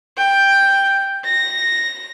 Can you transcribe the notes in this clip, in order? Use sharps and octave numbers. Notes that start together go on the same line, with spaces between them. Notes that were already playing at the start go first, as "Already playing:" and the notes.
G5
A#6